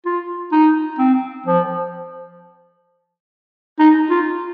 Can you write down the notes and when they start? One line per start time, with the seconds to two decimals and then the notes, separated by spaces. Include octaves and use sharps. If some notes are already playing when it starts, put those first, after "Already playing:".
0.06 F4
0.52 D#4
0.98 C4
1.46 F3
3.79 D#4
4.10 F4